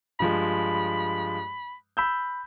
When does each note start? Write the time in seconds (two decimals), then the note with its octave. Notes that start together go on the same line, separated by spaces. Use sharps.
0.20 G2 F3 G#3 B5
1.97 B5 E6 G6